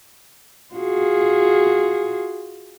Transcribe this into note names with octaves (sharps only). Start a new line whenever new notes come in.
F4 F#4 G#4